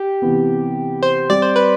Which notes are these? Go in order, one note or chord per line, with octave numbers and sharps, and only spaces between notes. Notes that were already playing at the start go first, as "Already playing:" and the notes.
Already playing: G4
C3 E3 B3
C5
G3 C4 G4 D5
C5
B4